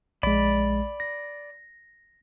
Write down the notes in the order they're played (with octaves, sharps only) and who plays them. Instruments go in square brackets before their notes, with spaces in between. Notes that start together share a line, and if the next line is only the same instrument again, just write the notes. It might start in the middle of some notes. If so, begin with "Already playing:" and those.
[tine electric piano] A#1 G#3 [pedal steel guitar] D5 B5
[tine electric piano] A#6